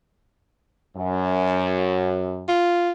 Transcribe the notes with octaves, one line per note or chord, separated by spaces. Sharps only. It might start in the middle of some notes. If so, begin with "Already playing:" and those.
F#2
F4